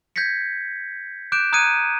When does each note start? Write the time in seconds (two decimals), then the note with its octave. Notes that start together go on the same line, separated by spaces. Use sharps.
0.16 G6 G#6 A#6 B6 C#7
1.32 D6 F#6 G6 D7 E7
1.52 A#5 D#6 F#6 G#6 C#7 D#7